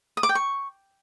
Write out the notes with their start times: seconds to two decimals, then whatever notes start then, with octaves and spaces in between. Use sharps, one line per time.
0.17 D#6
0.23 D6
0.29 G5
0.35 C#6